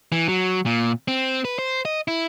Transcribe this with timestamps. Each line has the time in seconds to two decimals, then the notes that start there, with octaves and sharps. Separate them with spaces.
0.12 E3
0.28 F#3
0.66 A#2
1.08 C4
1.45 B4
1.59 C5
1.85 D#5
2.08 E4